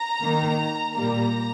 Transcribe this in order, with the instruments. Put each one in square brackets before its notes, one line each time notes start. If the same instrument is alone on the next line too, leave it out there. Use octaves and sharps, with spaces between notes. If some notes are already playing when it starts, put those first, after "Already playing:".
Already playing: [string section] A#5
D#3 A#3
A#2 G3 A#3 A#5